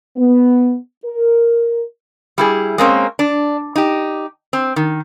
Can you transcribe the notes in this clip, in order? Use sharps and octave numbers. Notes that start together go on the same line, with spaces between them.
B3
A#4
G3 E4 G#4
G#3 A#3 C4 C#4
D4
D#4 G4
C4
D#3